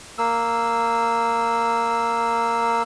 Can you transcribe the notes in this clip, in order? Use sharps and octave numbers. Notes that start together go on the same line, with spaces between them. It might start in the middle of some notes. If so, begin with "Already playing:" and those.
A#3 E6